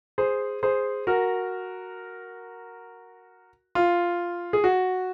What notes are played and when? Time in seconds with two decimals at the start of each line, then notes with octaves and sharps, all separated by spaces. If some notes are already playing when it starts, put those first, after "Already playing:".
0.18 G#4 C5
0.63 G#4 C5
1.07 F#4 A#4
3.75 F4
4.53 G#4
4.64 F#4